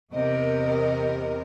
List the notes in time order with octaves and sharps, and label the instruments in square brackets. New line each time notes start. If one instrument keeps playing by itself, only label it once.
[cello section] E2 C3 A#4 [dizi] D#5